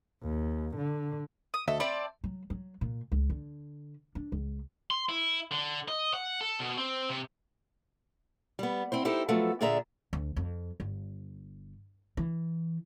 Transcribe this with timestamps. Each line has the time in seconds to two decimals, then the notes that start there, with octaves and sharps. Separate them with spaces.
0.23 D#2
0.77 D3
1.54 D#6
1.68 D2 A4 D#5 E5
1.80 C4 D5 E5 A5 B5
2.24 F#3
2.50 F#3
2.81 A#2
3.12 C#2
3.30 D3
4.15 D4
4.32 C#2
4.91 C6
5.09 E4
5.51 D3
5.88 D#5
6.14 F#5
6.41 A4
6.59 B2
6.78 C4
7.09 C3
8.59 G3 B3
8.92 C4 E4 C5
9.05 D#4 E4 G4 A4 C5
9.28 F3 F#3 A3 B3 A4
9.61 A#2 D3 G#4 D5 E5 A#5
10.13 D2
10.36 F2
10.80 G1
12.17 E3